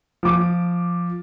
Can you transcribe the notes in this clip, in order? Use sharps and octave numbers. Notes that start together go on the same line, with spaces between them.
F3 D6